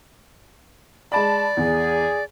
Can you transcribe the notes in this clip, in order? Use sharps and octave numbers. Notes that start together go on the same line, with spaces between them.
G#3 D5 A5 B5
E2 G#4